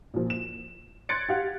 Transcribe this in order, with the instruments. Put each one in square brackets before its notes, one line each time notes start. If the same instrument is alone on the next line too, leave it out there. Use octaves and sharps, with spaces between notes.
[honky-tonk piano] A#2 F3
E7
C6 F#6 G#6 A6 C#7 D7
G4 F5 F#5